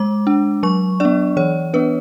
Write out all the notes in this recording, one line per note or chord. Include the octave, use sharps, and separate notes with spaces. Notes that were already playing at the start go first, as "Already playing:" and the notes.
Already playing: G#3 D6
D4
F#3 C#6
B3 D4 D5
E3 C#5
B3 D4 B4